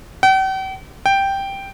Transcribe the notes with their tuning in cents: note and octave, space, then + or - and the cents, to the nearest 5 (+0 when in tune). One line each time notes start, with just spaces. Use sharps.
G5 -45
G5 +0